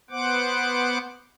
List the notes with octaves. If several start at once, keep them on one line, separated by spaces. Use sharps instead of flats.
B3 C5 F#5 D6